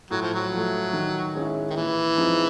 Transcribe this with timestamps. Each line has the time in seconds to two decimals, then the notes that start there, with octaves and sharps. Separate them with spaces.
0.11 A2 F#3
0.22 F3
0.34 F#3
0.52 F3 A3
0.93 D#3
1.35 G#3 C#4 E4
1.70 D#3
1.76 A#2 E3
2.18 F3 G#3 C4 D#4